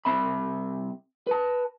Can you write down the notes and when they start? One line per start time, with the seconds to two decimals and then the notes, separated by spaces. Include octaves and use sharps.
0.05 C2 C4 E5 B5
1.27 B4 A5